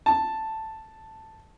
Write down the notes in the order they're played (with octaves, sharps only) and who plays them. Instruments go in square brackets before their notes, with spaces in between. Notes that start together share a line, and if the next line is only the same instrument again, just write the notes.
[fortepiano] A5